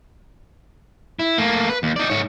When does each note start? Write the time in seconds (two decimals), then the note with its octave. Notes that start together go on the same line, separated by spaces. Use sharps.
1.19 E4
1.38 A3 A#3
1.69 B4
1.83 D#2
1.96 D#4 D5
2.10 G#2 C#5